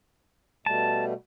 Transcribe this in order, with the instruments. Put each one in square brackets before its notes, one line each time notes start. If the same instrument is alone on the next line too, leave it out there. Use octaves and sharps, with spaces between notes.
[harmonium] B2 G3 A3 [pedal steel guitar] A5